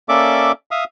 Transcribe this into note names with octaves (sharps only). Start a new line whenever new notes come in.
A#3 C#4 A4 D5 E5 D6
E5 F5 D#6